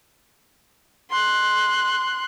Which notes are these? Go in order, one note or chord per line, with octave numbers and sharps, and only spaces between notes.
C6 F#6